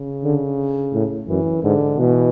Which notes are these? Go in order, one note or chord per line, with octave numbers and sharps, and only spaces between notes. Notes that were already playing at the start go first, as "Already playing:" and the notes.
Already playing: C#3
D3
A2
F#2 E3
G#2 D3
B2 E3